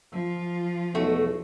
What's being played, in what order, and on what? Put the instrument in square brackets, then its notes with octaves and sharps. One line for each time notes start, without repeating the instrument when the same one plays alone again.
[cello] F3 F4
[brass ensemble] B1 E2 [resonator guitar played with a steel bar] A3 F#4 A4